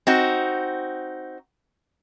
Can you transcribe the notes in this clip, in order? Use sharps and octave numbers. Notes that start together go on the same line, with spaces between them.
C4 D#4 F#4